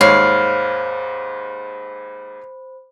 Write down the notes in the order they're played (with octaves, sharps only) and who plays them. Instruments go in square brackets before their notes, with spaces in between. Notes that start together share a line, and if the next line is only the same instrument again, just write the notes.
[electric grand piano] D#2 G#2 [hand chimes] C5 B5 [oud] C#5 [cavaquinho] F5